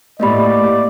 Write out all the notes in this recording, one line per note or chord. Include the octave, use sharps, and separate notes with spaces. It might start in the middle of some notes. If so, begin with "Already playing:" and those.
A2 A#3 B3 G4 D5 D#5 B5